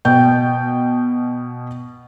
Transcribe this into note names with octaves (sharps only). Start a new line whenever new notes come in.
B2 G5 G6